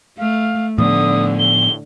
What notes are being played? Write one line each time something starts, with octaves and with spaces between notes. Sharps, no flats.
A3 F5
A2 D3 F3 B3 D#6
G7